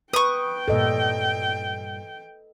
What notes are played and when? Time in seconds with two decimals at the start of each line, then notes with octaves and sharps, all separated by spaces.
0.13 B4 G5 C#6 D#6
0.68 G2 A#2 A4 D#5